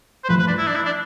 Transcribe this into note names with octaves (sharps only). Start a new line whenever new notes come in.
C5
G2 F3 A3 B4
B4
D4
E4
D4
E4
D4